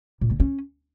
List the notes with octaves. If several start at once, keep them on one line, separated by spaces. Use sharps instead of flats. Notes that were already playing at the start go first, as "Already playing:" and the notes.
A#2
D3
C#4